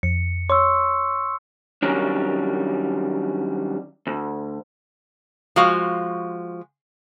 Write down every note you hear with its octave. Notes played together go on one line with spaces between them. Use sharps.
F2 C#7
C#5 C6 C#6 E6
D#3 F#3 G3 C#4 D4
D2
F3 G#3 F#4 F5